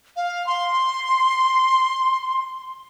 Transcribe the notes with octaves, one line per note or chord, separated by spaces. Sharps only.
F5
C6